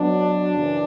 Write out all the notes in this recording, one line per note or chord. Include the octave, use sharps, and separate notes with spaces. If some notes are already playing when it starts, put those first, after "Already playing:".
Already playing: B2 F#3 D4
F#2 C#3 E3